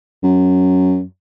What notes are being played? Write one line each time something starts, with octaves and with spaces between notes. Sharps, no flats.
F#2